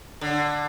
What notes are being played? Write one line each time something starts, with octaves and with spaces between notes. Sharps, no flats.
D3